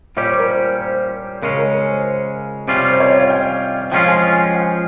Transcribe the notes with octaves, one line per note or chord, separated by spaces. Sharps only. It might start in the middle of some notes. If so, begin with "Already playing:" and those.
A#2 G3 C#4 G4 C#5
C5
A#4
C5
C5
C#3 G#3 C#4 A#4
A#4
A#4
C5
C5
C3 G3 C#4 F4
C5
C#5
D#5
F5
G5
F5
F3 G#3 C#4 F4 G5
G#5
G#5
G#5
G5
G#5